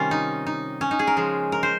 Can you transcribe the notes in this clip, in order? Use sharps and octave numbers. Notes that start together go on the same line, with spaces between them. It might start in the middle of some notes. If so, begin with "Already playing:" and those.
Already playing: C3 D#3 G3 C#4 F4
D#4
D#4
C#4
D#4
G#4
A#4
C#3 F3 G#3
A#4
C5